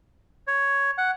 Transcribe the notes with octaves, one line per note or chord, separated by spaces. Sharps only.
C#5
F#5